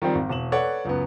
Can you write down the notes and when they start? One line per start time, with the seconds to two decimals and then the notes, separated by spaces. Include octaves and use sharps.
0.02 D#3 F3 G3 C4
0.15 G#1
0.29 E1 E7 F#7
0.52 A4 B4 C#5 D5 F#5
0.85 C#2 F#2 B3